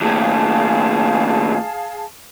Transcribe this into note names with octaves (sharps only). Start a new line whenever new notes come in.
D#2 A2 G#4 F5 A5